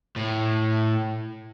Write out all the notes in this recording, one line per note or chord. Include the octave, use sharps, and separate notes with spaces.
A2